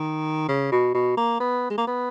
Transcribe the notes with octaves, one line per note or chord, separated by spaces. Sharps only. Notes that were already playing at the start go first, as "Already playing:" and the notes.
Already playing: D#3
C#3
B2
B2
A#3
B3
G#3
A#3
B3